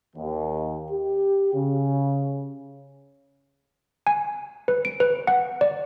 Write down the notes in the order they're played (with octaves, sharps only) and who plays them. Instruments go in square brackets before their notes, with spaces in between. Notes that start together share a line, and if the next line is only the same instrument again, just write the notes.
[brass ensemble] D#2
G4
C#3
[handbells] G#5
B4
D7
B4
F#5
D5